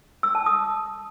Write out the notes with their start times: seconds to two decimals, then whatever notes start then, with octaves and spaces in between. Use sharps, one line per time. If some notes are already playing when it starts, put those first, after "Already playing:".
0.23 E6
0.35 A5
0.46 D#6